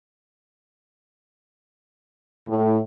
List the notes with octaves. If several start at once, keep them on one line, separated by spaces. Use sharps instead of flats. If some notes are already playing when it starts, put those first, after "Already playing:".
A2